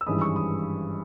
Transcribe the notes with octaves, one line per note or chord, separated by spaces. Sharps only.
E6
G#1 G2 E3 G#3 C#4 B5 D#6
C#6 E6
B5 D#6